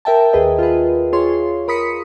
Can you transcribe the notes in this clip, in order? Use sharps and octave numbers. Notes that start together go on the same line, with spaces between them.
A#4 E5 G5 A5
D#2 G#4 B4 D#5
F4 G#4 B4
F4 G#4 C#5 C6
A#4 B5 D#6 B6 C#7